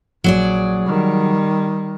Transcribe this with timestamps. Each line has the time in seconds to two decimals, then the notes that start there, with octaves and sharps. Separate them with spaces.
0.24 A#1 F#3 G#4 D5
0.86 D#3 G3